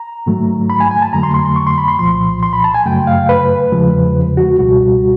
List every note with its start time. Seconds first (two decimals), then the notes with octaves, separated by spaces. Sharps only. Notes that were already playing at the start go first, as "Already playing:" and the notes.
Already playing: A#5
0.26 G#2 D#3 F#3 A3
0.70 B5
0.80 G#5
0.91 G#5
1.02 A5
1.13 F2 D3 F#3 A3 A#5
1.23 C6
1.34 C6
1.45 C6
1.56 C#6
1.67 C6
1.78 B5
1.88 C6
1.99 C2 A#2 F3 C6
2.43 C6
2.53 B5
2.64 A5
2.74 G#5
2.86 F#2 C#3 F#3 A3 G5
3.07 F5
3.29 B4
3.72 E2 C#3 F3 G#3
4.37 F#4
4.59 C#2 B2 G3 F#4